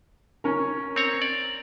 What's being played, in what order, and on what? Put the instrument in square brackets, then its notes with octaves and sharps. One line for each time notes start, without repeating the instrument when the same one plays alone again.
[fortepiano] C#4 A#4
[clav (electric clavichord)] C4 C#5 A#5
D5